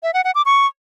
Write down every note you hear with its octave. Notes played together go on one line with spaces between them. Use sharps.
E5
F#5
F#5
D6
C#6